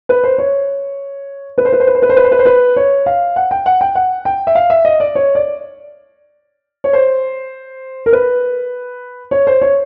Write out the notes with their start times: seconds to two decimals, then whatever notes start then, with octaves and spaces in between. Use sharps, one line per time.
0.09 B4
0.24 C5
0.38 C#5
1.58 B4
1.65 C5
1.72 B4
1.80 C5
1.87 B4
1.95 C5
2.02 B4
2.09 C5
2.16 B4
2.24 C5
2.31 B4
2.39 C5
2.45 B4
2.76 C#5
3.06 F5
3.36 F#5
3.51 G5
3.66 F#5
3.81 G5
3.95 F#5
4.25 G5
4.47 E5
4.55 F5
4.70 E5
4.85 D#5
5.00 D5
5.15 C#5
5.35 D5
6.84 C#5
6.93 C5
8.06 A#4
8.13 B4
9.31 C#5
9.47 C5
9.62 C#5